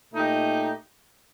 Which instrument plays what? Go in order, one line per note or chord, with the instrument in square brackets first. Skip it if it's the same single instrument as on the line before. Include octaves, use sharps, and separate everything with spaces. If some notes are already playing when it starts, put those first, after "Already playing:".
[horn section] A#2 A3 D#4 G4